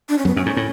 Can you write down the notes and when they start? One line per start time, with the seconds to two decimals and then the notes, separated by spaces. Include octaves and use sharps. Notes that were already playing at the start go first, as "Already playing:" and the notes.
0.09 D4
0.18 C#4
0.25 F#2 B3
0.36 F#2 C#4
0.46 G#2
0.57 A2